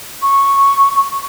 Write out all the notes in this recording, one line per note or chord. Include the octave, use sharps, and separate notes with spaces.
C#6